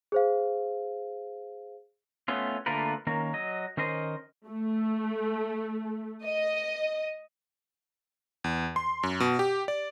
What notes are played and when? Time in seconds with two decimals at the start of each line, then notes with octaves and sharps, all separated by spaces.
0.12 G#4 C5 F5
2.28 A3 B3 C#4 F4
2.66 D3 A3 A#3 F4 A#4 B4
3.07 D#3 A#3 C#4 A#4
3.33 F#3 D#5
3.77 D#3 C#4 A#4 C5 D#5
4.48 A3
6.24 D#5
8.44 E2
8.76 C6
9.03 F#2
9.20 B2
9.39 G4
9.68 D5